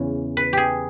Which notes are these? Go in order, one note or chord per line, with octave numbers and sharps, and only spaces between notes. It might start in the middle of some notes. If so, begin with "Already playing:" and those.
Already playing: E2 C#3 E3
B4
G4 G#4